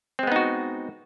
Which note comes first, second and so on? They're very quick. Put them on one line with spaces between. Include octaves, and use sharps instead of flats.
C4 G#3 B3 D#4 F#4